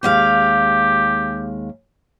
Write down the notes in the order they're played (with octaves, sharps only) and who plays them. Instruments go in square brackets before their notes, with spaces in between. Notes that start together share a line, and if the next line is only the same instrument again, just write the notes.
[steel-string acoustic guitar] D#2 G#3 F5 [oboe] G4